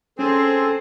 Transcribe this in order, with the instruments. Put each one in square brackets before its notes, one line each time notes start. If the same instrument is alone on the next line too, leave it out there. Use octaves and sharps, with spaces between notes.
[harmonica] C4 G#4 [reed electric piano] C#4 [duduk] A4 [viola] C5